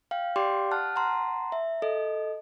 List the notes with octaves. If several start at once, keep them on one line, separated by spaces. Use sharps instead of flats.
F5 G5
G4 D5 F5 G5 C6 D6
F#5 A5 F6 F#6
F#5 A5 A#5 C6
E5
A4 D#5